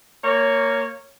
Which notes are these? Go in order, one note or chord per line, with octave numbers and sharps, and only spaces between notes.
A#3 C#5